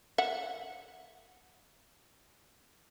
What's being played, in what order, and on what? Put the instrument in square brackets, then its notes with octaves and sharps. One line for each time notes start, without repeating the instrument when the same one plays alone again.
[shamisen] E5 F#5